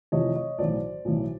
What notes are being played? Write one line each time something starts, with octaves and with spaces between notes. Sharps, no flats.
F1 F2 C3 E3 C#5 D#5
C#5 D#5
B1 A2 E3 C5 D5
B1 A2 E3